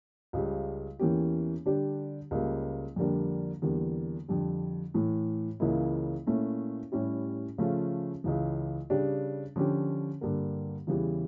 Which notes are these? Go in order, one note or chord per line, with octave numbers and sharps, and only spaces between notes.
C#2 C#3 G3
E2 E3 A#3 C#4 G4
D3 G3 D4 G4
C#2 C#3 G3 A#3
F2 D3 G3 A#3 D4
E2 D3 G3 A#3
F2 D3 G3
A2 E3 A3
C#2 C#3 E3 A#3 E4
A#2 A3 C#4 E4
A2 G3 C#4 E4 G4
C#3 F3 A3 C#4 F4
C#2 C#3 E3
C#3 G3 D4 G4
D3 F3 C#4 G4
G2 D3 G3 A#3
E2 C#3 E3 G3